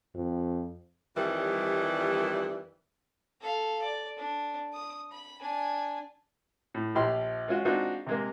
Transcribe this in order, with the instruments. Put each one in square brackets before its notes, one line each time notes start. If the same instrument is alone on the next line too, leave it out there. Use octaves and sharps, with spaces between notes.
[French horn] F2
[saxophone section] F2 D#3 E3 G3
[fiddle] A4 F5
D5
D4
D#6
B5
D4 G#5
[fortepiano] A2
A#1 F3 G4 B5 C6 F6
G#3 C#4 F4 F#4
G#3 C4 D4 D#4 F4 F#4
C3 G#3 A#3